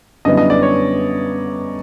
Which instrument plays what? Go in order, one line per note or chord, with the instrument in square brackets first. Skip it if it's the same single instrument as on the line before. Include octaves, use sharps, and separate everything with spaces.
[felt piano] F#2 D3 G3 B3 E4 [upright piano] D#5
[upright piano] D#5
D5
C#5